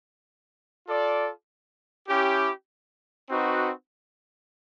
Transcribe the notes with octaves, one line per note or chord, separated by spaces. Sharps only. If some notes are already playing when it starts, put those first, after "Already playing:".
F4 A4 D5
C#4 E4 G4
C4 D#4 F#4 B4